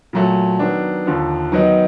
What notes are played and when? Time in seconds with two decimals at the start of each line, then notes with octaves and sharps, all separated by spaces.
0.13 A#2 F#3 A3
0.59 D#3 F#3 B3 D4
1.06 D#2 D3 F3
1.52 D#3 F#3 B3 D#4